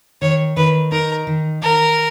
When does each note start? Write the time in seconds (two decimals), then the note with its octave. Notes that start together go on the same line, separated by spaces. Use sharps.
0.22 D#3 C#5
0.57 D#3 B4
0.92 D#4 A#4
1.27 D#3
1.62 D#3 A#4